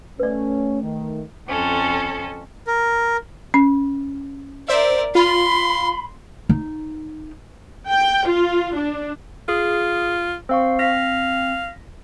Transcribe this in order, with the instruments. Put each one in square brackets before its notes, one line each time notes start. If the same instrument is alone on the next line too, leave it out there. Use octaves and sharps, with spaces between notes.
[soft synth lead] A3 [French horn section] C#4 [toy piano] B4 D5
[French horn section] D#3
[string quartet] F2 C#4 A4
[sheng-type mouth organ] A#4
[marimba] C#4
[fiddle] A#4 D5 [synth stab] C5 E5
[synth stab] F4 [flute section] B5 [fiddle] C6
[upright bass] D#4
[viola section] G5
F4
D4
[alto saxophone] F4 [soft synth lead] G#4
[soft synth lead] C4 [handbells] C5 F5 C#6
[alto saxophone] F5 [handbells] A#6 B6